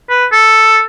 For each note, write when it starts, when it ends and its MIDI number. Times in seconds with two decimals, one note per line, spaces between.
0.10 0.26 71
0.32 0.81 69